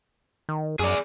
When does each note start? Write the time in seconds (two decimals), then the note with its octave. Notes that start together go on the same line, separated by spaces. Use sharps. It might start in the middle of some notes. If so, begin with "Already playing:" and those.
0.49 D#3
0.79 F#2 G#4 D5